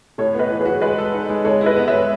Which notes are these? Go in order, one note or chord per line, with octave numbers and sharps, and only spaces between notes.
A2 A4 C#5
B3 B4 D#5
E3
G#4 B4
F#4
G#3 G#4 B4
A4
D#4
G#3
G#3 A4 C#5
E4
B4 D#5
B3
C#5 E5
G#3